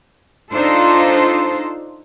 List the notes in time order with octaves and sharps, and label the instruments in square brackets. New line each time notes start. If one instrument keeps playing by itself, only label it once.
[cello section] D4 D#4 F4 A4 C5